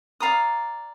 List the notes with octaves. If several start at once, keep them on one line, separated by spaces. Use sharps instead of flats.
D5 F5 A#5 D#6